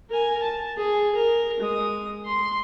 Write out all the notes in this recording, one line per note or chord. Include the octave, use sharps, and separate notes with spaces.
A#4 G#5
A5
G#4
A#4
G#3 D#6
C6